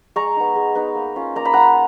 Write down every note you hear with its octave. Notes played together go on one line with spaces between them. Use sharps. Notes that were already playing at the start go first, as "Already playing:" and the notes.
G#3 A#5 C#6
B3 D#4
G#3
B3 D#4
A#3
C#4 F4
A#3 A#5
B5
C#4 F4 F#5 A#5